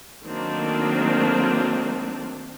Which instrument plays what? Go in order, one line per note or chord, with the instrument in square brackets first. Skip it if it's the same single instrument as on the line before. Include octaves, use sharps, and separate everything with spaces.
[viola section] D#3 F#3 A3 A#3 C4 D4